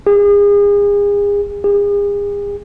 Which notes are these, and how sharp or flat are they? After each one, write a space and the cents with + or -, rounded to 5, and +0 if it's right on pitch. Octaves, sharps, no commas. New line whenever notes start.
G#4 -35
G#4 -40